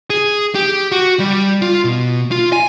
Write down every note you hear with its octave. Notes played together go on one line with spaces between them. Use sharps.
G#4
G4
F#4
G3
F4
B2
F4
G#5